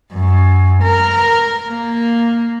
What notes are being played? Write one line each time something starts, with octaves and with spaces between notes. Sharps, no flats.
F#2
A#4
A#3